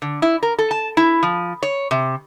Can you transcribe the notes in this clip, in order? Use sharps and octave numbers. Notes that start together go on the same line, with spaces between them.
D3
E4
A#4
A4
A5
E4
F3
C#5
C3